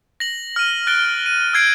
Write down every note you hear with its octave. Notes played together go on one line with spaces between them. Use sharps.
A#6 F#7
F6 D#7
F#6 A6 D7 G7
D#7
E6 G6 G#6 C7 D7